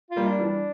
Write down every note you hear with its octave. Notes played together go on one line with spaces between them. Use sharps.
F4
G3 A#3
D4
E3 G3
D4